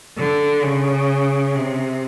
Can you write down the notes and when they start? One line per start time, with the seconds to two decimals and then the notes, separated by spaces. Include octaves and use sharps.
0.18 D3
0.63 C#3
1.55 C3